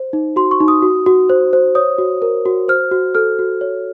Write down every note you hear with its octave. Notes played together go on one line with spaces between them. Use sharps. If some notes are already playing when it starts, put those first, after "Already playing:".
Already playing: C5
D#4
F#4 C6
C#6
D#4
D#6
F#4
F#4
C5
C5
C#5 D#6
F#4
A#4
F#4
C5 F6
F#4
A4 F6
F#4
C#5